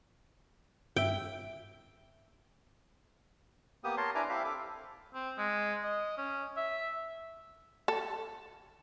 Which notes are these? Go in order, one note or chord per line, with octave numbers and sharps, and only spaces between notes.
G2 E5 G5
A#3 B3 G4 D#6
A#4 C#5 A5 C6
D4 E4 B4 G#5 A#5 D6
C4 E4 G4 E5 F5
A4 D6
C4
G#3
D#5
C#4
E5
A4